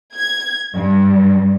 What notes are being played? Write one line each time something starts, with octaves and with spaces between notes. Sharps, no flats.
G#6
G2